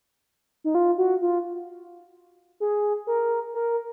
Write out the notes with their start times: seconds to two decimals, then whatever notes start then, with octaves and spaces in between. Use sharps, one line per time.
0.64 D#4
0.75 F4
0.98 F#4
1.22 F4
2.60 G#4
3.07 A#4
3.54 A#4